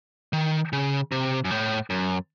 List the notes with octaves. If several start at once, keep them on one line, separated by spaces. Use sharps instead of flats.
D#3
C#3
C3
F#2
A2
F#2